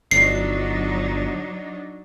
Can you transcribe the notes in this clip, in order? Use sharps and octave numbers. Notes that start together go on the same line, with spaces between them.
G1 F#3 D4 D#4 C7